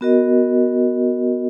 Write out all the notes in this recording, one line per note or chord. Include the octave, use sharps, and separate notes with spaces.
B3 F#4 A#4 D#5